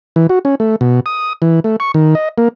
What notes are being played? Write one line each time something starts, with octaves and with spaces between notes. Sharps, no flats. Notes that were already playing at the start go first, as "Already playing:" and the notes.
E3
F#4
C#4
A3
B2
D#6
E3
A3
C#6
D#3
D#5
A#3